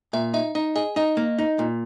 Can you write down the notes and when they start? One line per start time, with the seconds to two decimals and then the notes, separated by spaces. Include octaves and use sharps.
0.13 A#2 E5
0.34 D#4 E5
0.55 D#4 D#5
0.76 G#4 D#5
0.96 D#4 D#5
1.17 A#3
1.38 D#4
1.59 A#2